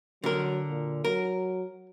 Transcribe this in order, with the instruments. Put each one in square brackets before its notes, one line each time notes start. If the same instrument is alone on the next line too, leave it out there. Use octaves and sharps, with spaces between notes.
[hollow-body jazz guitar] D3 A#4 [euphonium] F#3
[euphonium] A#2
[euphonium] F#3 [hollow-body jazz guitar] A#4